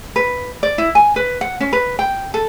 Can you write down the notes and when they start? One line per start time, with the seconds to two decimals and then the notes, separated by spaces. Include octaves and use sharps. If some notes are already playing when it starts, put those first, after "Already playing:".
0.16 B4
0.63 D5
0.78 E4
0.95 G#5
1.16 B4
1.41 F#5
1.60 C#4
1.73 B4
1.99 G5
2.34 A4